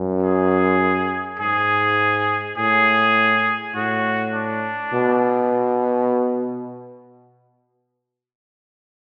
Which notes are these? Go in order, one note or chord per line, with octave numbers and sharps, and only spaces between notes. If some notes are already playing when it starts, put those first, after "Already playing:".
Already playing: F#2
G#4
G#2 G#4
A2 G#4
A2 F#4
D4
B2